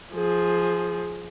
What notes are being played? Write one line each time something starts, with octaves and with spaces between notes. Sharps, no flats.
F3 G#4